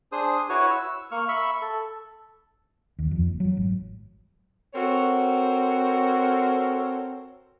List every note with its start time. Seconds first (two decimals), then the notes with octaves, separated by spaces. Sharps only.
0.12 D4 G#4 C5 D#6
0.49 E4 F#4 B4 C#5
0.71 E6
1.12 A#3 C#6 F6
1.29 E5 B5 C#6 E6
1.62 A4
2.99 D#2
3.11 F2
3.27 F#1
3.40 F#3
3.57 G#1
4.74 C4 F#4 A4 A#4 C#5